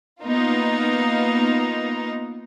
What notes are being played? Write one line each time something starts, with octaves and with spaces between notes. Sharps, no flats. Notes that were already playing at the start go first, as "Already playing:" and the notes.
A#3 B3 D#4 F4